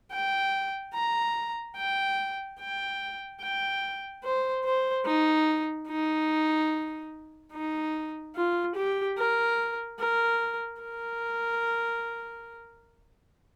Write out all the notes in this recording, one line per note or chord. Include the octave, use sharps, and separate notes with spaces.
G5
A#5
G5
G5
G5
C5
C5
D#4
D#4
D#4
F4
G4
A#4
A#4
A#4